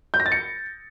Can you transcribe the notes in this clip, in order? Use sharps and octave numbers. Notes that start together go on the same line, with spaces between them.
G6
A#6
A6
C#7